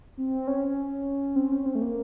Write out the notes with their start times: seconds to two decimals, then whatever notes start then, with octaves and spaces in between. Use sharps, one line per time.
0.18 C4
0.47 C#4
1.36 C4
1.52 C#4
1.66 C4
1.75 A3
1.82 A#3